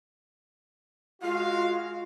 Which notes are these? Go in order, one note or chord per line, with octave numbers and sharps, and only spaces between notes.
G#3 F4 F#4 F5